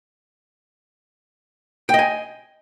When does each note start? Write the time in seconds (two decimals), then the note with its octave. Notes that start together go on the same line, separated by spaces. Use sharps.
1.89 G5
1.94 D#5
1.99 G#5